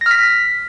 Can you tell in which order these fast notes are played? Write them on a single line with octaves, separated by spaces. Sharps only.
A#6 F6 B6